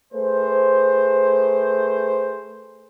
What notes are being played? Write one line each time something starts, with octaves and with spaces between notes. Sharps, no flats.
A3 G#4 B4 C5